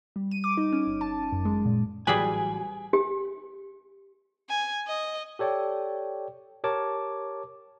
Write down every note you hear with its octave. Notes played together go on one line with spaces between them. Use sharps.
G3
D#7
D6
D#4
C#4
G1
A5
F#2
G#3
A#2
A1 F#3 G3 G#4 B4 G#5 D7
G4
G#5
D#5
G4 A4 C#5 D5 G5
G4 A#4 C#5 A5 D6